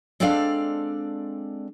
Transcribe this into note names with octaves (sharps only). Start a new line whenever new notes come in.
G#3 C4 D4 A4 D5 F5